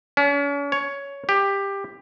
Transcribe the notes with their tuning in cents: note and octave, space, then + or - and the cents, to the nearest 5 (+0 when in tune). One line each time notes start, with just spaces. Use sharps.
C#4 +40
C#5 +10
G4 +15